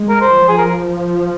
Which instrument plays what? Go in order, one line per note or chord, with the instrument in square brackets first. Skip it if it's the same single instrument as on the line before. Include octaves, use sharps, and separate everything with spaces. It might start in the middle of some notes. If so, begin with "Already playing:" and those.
Already playing: [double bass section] G#3
[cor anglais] A#4
C5
[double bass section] F3
[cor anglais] G#4
A#4